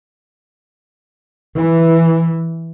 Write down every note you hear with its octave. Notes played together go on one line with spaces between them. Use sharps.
E3